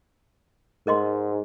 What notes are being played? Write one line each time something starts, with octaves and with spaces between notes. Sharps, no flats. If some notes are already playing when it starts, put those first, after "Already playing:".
G#2 A#4 D#5 C6